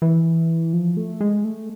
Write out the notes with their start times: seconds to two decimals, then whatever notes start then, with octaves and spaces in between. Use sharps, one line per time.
0.02 E3
0.73 F3
0.97 A3
1.20 G#3
1.44 A3